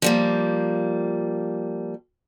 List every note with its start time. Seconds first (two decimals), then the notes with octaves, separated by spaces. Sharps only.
0.02 F3 G3 A#3